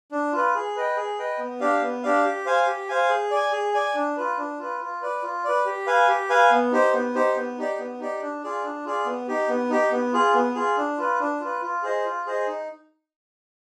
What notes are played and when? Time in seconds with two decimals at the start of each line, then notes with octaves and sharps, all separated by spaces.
0.12 D4
0.33 F4 B4
0.55 G#4
0.76 B4 D#5 G5
0.96 G#4
1.19 B4 D#5 G5
1.39 B3
1.60 D4 G4 D5 F5
1.82 B3
2.03 D4 G4 D5 F5
2.25 G4
2.46 C5 F5 G#5
2.67 G4
2.89 C5 F5 G#5
3.10 G#4
3.31 D5 G#5
3.52 G#4
3.74 D5 G#5
3.95 D4
4.17 F4 B4
4.37 D4
4.59 F4 B4
4.80 F4
5.02 B4 D5
5.23 F4
5.44 B4 D5
5.65 G4
5.86 B4 F5 G#5
6.08 G4
6.30 B4 F5 G#5
6.51 B3
6.72 D#4 G4 C5
6.93 B3
7.14 D#4 G4 C5
7.37 B3
7.58 D#4 G4 D5
7.79 B3
8.00 D#4 G4 D5
8.21 D4
8.43 F4 G#4 D5
8.64 D4
8.85 F4 G#4 D5
9.06 B3
9.28 D#4 G4
9.49 B3
9.70 D#4 G4
9.92 B3
10.13 F4 G#4
10.34 B3
10.55 F4 G#4
10.77 D4
10.98 F4 B4
11.20 D4
11.40 F4 B4
11.62 F4
11.83 G#4 C5 D#5
12.05 F4
12.26 G#4 C5 D#5
12.47 D#4